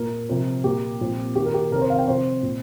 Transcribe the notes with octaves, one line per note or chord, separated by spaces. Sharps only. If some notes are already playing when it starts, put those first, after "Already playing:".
Already playing: A#2 A#3 A#4
C3 F3 C4
A#2 A#3 G4
A#2 F3 C4
D#3 A#3 G4
A#4
G4
C3 D#3 C4 A#4
C5
F5
G5
C3 F3 C4 C5
A#2